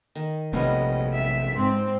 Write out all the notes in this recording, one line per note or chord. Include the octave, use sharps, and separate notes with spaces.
D#3
A#1 C3 G3 A3 B3 C#4 D#5
E5
G#2 C4